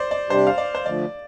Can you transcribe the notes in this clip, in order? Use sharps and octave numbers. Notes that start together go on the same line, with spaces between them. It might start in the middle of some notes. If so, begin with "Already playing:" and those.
Already playing: C5 D5
D5
C3 G3 D4 G4 C5
F5
D5
C5
D3 F3 A3 D5